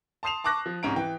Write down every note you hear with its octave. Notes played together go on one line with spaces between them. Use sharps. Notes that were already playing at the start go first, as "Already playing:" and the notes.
A5 C6 D#6 C7 E7 F7
A5 C#6 D6 F#6 A#6
F3
C2 G#2 C#4 A#5 D7
E3 G5